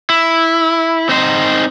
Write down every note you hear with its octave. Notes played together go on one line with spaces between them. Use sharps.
E4
C4 D#4 C5